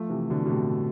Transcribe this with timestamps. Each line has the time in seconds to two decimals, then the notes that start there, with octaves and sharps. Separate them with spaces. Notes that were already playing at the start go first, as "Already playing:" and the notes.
Already playing: F3 A3
0.09 C3 E3
0.30 B2 D3
0.46 B2
0.50 A2 C3